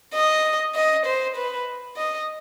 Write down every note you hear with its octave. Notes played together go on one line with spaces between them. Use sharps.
D#5
D#5
C5
B4
D#5